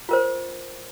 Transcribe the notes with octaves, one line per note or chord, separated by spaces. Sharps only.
F4 A#4 C5